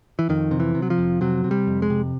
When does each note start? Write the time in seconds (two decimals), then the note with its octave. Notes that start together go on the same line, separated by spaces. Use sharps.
0.19 E3
0.29 F2 D#3
0.51 C3
0.60 E3
0.75 C3
0.82 F#3
0.90 F3
0.98 F2
1.21 C3 F#3
1.44 C3
1.51 G3
1.67 F2
1.82 G#3
1.90 C3